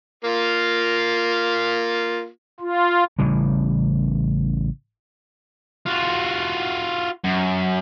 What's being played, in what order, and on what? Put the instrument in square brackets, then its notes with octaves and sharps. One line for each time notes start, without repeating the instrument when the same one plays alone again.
[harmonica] A#3 F4
[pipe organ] F4
[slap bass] A1 C#3 E3 G3
[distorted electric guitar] F4 F#4
F#2